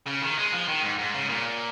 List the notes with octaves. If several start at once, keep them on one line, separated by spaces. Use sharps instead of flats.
C#3
D#3
G#3
F3
D#3
G#2
G#2
C#3
A#2